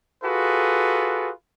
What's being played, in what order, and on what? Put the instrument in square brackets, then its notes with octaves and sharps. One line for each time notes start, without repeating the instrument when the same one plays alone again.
[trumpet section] F4 F#4 G#4 A4 B4